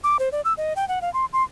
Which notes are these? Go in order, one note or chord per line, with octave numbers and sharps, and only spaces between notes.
D6
C5
D5
E6
D#5
G5
F#5
F5
C6
C6